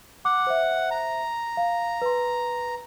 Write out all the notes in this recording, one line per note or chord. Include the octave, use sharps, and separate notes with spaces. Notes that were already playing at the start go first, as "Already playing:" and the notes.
F#5 D6
C5 E5
A#5
F5
B4 C6